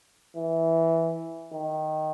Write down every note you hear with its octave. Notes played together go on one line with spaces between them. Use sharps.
E3
D#3